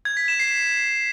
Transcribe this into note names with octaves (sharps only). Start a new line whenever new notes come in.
G#6
B6
E7
C7